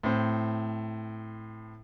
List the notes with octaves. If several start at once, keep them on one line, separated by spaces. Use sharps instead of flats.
A2 C4